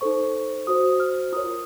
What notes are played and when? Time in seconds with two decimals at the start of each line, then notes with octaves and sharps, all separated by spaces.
0.01 D#4 A4 C5 C#6
0.67 F#4 C5 D#6
1.00 F6
1.32 F4 A#4 C#5 D#6